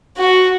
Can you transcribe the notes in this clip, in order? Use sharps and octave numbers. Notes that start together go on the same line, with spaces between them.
F#4